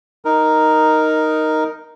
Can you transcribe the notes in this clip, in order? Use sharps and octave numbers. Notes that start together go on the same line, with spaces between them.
D#4 A#4